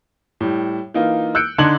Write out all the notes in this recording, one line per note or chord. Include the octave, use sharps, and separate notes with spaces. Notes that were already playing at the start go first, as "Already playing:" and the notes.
A2 G3
E3 A#3 D#4 F4
E6 F#6 G6 C#7 D7
D3 D4 D#4 C6 G#6 F#7